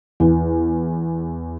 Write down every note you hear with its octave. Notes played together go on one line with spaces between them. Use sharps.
E2